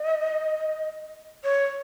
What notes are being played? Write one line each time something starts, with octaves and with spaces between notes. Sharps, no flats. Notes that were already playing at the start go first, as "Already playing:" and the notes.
Already playing: D#5
C#5